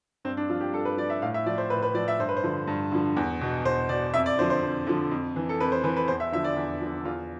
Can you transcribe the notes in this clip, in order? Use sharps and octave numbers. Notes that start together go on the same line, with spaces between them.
G2 C4
D4
F3 F4
G4
G2 A4
B4
F3 D5
E5
A2 F5
E5
F3 D5
C5
A2 B4
B4
F3 D5
E5
G2 C5
B4
C5
D3 F3
G2
D3 F3
E2
B2
E2 C5
B2 D5
F2 E5
D5
D3 F3 C5
C5
F2
D3 F3
F2
E3
A4
F2 B4
C5
E3 B4
B4
E2 C5
E5
D3 F3 E5
D5
E2
D3 F3
E2 F4